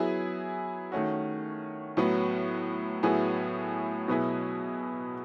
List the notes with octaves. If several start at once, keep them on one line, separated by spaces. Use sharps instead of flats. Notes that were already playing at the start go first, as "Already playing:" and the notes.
Already playing: F#3 B3 E4 G#4
D#3 A3 C#4 F#4
A2 F#3 B3
A2 F#3 B3 E4 G#4
B2 F#3 B3 E4 G#4